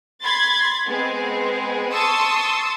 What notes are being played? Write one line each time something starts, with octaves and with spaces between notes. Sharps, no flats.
B5 C6 G#6 A6
G#3 B3 C4 G#4
A5 C6 C#6 D#6 E6 A6